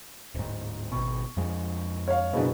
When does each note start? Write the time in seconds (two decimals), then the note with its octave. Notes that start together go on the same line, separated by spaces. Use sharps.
0.35 D1 G#2
0.92 G#1 B2 C#6
1.36 F2 F3 G#3
2.08 C#5 F5
2.33 F#1 B2 A#3 D4 G#4